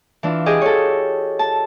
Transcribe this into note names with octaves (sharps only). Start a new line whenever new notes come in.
E3 D4 F4
G4 G#4 D#5
A4 C#5
A5